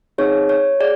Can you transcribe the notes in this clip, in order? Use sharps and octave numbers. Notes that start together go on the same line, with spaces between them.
C4 D#4 G#4 C#5
C#5
G#4 D5